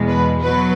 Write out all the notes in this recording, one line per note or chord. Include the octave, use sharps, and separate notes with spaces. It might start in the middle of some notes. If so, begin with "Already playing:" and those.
Already playing: E2 B2 G#3
B4
B2 F#3 B4